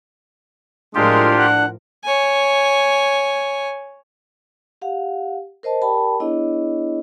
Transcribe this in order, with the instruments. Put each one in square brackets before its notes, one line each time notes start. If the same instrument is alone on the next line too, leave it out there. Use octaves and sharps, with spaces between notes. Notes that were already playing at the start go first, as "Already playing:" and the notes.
[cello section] A2 F3 A#4 [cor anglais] G#3 [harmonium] D4 [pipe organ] F4 G4
[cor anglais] F#5
[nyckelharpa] C#5 G#5
[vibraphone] G4 F5 F#5
A#4 C5 D#5 A5
G4 A#4 D5 G5 A5 B5
B3 D4 E4 G#4 C#5 D#5